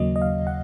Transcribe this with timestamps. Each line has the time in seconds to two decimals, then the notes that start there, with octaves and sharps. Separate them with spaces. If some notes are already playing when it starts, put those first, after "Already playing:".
Already playing: D#2 C#3 F#3 A#3 D#5
0.16 D#5
0.22 F5
0.47 F#5